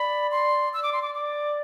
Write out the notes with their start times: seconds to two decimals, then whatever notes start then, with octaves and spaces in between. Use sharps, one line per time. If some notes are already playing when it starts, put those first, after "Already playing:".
Already playing: D5 B5
0.31 C6
0.73 E6
0.83 D6
0.93 C6
1.02 D6
1.15 D6